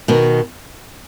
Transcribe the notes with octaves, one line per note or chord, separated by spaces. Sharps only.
B2 D#3